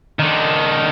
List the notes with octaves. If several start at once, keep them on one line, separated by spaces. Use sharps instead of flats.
D#3 D4